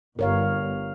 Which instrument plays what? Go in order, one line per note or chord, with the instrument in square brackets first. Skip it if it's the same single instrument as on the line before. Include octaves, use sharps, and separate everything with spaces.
[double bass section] G1 [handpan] A#4 C#5 F5